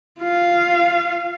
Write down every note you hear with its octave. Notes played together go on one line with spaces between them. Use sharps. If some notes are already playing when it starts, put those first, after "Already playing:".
F4 F5